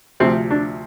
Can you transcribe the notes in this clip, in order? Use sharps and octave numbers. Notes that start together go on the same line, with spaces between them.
D2 C3 F3 C4
D4